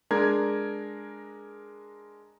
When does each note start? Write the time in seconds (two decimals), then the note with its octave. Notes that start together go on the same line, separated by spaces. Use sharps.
0.11 G#3 D4 A#4 G#6